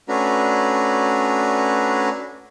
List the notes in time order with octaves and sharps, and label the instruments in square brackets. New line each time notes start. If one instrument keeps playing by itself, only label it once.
[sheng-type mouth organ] A3 C#4 D4 F#4 B4 A#5